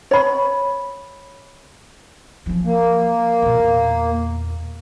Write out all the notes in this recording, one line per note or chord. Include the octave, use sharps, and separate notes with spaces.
C#5 B5
F3 C#4
A#3
E2 A#2